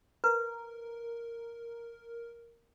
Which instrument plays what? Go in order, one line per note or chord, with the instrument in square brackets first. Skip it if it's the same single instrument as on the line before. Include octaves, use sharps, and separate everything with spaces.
[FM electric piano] A#4 [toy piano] B4